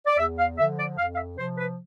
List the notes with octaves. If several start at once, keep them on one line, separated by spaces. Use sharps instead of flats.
D5
E2 E5
F5
D3 F3 E5
D5
F2 F5
F5
E5
C3 F3 C5
B4